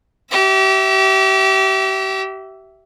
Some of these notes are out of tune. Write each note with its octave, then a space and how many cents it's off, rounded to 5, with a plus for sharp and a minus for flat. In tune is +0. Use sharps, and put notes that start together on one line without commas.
G4 -35 E5 +0